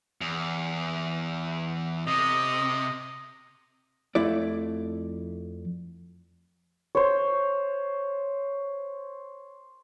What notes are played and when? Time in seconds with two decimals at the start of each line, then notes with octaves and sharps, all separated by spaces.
0.21 E2
2.07 C3 D#5
4.15 F2 A3 E4 D5
6.95 C5 C#5